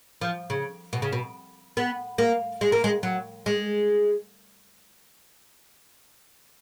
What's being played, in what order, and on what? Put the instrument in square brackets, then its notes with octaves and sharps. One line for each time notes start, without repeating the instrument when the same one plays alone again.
[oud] F3
C#3
B2
C#3
B2
B3
A#3
G#3
A#3
G#3
F#3
G#3